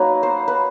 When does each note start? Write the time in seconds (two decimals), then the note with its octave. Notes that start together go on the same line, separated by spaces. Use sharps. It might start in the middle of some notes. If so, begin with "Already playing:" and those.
Already playing: F#3 A#3 D#4 B4
0.23 C5
0.48 B4